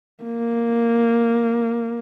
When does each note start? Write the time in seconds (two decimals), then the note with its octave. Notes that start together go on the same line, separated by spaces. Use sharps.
0.24 A#3